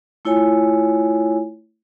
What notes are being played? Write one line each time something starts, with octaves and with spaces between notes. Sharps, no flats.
A3 E4 F4 C#5 G#5